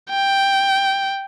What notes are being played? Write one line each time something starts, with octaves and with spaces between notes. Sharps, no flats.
G5